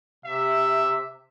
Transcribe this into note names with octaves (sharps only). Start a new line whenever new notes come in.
C3 E5